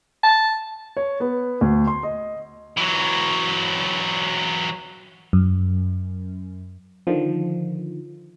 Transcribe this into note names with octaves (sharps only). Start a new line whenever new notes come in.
A5
C#5
B3
D2
C6
D#5
E3 F#3
F#2
D3 D#3 F3